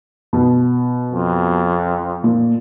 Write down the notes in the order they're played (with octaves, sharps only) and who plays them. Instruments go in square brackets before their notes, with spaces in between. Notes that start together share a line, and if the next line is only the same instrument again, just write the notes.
[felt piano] B2
[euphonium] F2
[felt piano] A#2